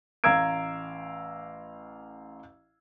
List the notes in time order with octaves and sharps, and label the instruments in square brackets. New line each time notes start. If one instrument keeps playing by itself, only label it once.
[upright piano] A1 F5 A#5 E6 G#6 D7